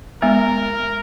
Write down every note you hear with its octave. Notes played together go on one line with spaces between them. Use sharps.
G#3 B3 A#4 E5